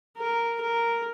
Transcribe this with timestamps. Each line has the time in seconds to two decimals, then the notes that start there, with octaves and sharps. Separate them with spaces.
0.18 A#4
0.61 A#4